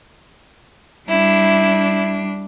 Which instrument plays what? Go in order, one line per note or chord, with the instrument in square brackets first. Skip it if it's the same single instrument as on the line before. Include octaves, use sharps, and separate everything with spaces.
[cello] G3 D4 [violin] E4